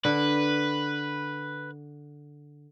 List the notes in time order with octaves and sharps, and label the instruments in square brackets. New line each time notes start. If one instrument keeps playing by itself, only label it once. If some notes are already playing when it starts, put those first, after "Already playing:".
[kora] D3 [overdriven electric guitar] B4